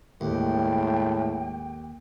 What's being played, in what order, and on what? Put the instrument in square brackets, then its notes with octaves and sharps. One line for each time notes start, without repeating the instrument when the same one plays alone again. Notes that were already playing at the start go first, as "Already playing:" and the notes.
[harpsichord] D#2 [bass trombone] A2 [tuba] G#3 [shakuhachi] G5